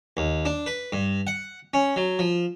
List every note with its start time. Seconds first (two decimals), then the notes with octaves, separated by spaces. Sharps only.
0.17 D#2
0.45 D4
0.66 B4
0.92 G2
1.27 F#5
1.74 C#4
1.96 F#3
2.19 F3